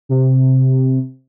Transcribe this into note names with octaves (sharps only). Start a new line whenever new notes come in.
C3